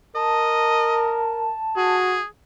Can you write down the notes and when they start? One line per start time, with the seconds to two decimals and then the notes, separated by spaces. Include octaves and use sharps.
0.15 A#4 D#5 A5
1.77 F#4 G#4